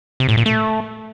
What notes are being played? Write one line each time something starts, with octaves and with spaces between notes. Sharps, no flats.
C3
A2
A#2
A3